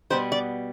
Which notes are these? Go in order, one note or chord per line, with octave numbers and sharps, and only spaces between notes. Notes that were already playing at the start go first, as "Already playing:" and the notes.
B2 G3 B3 C5
D5